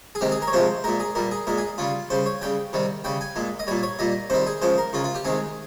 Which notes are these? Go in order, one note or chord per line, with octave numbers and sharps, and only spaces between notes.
G#4
C3 D#3 G#3 G4
G#4
A#4
C#5
C3 F3 G#3 C5
A#2 G#3 A#4
G#4
A#2 G3 A#4
G#4
A#2 G#3 A#4
G#4
C#3 G3 F4
C#3 G3 C5
C#5
C#3 G3 G5
C3 D#3 G3
C#3 G3 G5
G#5
A#2 G#3
D#5
A#2 G3 C#5
C#5
A#2 G3 D#5
C3 D#3 G3 C5
G#4
C#3 F3 G#3 C5
A#4
C#3 G#3 F4
F4
G4
C3 D#3 G#3 G#4